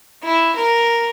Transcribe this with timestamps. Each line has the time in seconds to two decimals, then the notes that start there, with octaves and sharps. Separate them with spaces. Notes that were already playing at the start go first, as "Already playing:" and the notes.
0.23 E4
0.56 A#4